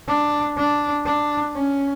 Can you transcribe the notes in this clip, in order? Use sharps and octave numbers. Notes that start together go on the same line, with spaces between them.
D4
D4
D4
C#4